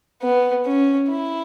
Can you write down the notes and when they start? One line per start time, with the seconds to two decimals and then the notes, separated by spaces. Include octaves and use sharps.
0.22 B3
0.65 C#4
1.10 E4